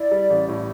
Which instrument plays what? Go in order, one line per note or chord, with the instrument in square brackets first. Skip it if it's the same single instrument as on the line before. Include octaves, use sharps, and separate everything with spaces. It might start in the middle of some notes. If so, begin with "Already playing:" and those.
Already playing: [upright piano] E4 [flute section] D5
[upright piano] G3
A1
A2